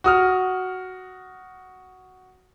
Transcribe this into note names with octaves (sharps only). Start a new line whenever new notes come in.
F#4 D#6 F6